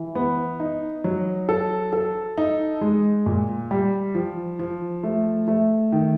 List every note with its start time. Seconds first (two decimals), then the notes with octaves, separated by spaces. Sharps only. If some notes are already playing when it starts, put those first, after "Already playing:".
Already playing: E3
0.15 B3
0.60 D#4
1.04 F#3
1.49 A4
1.93 A4
2.38 D#4
2.81 G#3
3.26 A#2
3.71 G3
4.15 F3
4.59 F3
5.03 A3
5.48 A3
5.92 D#3